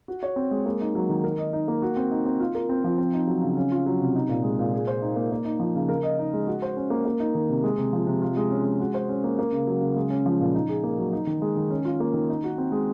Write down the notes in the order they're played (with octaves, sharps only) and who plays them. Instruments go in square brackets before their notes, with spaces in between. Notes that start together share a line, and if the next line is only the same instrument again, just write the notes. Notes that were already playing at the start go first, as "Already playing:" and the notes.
[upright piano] F#4
C#5
C4
G#3
A#3
D#4
F#3
D#3
A#4
D#5
D#4
A#3
F#4
C4
D#4
C4
F4
A#4
C4
F3
C4
D#4
F#3
C#3
C#4
F4
F#3
C3
D#4
A#2
G#3
A#2
G#4
C5
D#4
A#3
A#3
D#4
F3
C#3
A#4
D#5
D#4
G#3
F#4
C5
C#4
A#3
A#3
D#4
D#3
C3
G#3
C3
F3
C3
F4
G#3
C#4
G#3
F#4
C5
C#4
A#3
A#3
C#3
F#3
C#3
G#3
C#4
F3
A#2
D#4
G#4
A#3
F#3
D#4
D#3
G#3
D#3
C#4
F4
A#3
D#3
D#4
F#4
C4
G#3